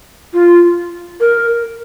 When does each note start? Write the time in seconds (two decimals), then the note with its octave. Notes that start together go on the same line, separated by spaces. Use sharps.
0.34 F4
1.20 A#4